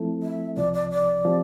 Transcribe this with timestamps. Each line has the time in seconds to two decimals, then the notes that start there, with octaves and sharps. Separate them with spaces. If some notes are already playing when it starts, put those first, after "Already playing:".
Already playing: F3 A3 C4 E4 A4
0.23 E5
0.57 C2 C3 F3 D5
0.74 D5
0.91 D5
1.25 F3 C4 G4